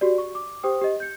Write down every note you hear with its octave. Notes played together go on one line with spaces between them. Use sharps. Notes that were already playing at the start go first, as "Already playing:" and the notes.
F#4 G4 D5
C#6
D6
G4 C5 G5 D#6
G4 D#5
G6 C#7